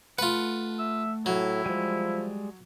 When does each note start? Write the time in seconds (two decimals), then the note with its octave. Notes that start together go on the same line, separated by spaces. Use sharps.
0.19 A3 F4 B4 F#5
0.79 E5
1.26 A2 F#3 E4
1.66 F3 G3 G#3